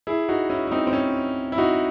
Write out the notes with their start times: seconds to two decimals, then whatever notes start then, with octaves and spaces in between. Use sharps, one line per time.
0.07 E4 G#4
0.29 D#4 F#4
0.50 C#4 E4
0.67 E4
0.71 C4 D#4
0.87 C4
0.93 C#4
1.52 E4
1.58 D#4 F#4